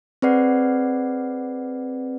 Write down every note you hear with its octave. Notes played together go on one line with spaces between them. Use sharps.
C4 G#4 B4 D5 F#5 C7